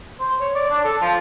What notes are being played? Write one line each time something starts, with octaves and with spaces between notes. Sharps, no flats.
C5
C#5
D5
D4
A4
F3